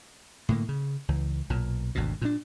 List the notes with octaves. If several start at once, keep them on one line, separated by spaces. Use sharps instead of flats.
A2 D3 A#3
C#3
C#2 E3
B1 A#2
G#1 D2 B2
A#2 F#3 D4